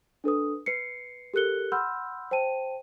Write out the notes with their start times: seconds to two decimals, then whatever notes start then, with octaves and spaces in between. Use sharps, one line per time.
0.24 D4 A4 B4 D#6
0.66 B4 C7 C#7
1.34 G4 A4 A#4 F#6 C#7 G7
1.72 F#5 B5 C6 E6 F6 G6
2.31 C5 G5 A5 D#7